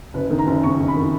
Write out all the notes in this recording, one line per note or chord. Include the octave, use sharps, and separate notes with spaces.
F#1 B4
D#3
A#5
F#1
F2 C#6
F2
B5
D#3